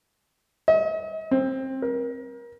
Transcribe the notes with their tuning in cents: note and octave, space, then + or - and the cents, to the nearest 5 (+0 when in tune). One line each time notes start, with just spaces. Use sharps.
D#5 +45
C4 +20
A#4 +30